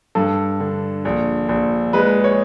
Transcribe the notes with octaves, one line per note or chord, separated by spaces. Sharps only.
G2 A4
D3
A#1
A#1
G#3 B4
C#5